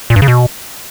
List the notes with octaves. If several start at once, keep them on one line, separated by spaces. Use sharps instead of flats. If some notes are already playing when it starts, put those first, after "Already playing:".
A#2
G2
C#3
B2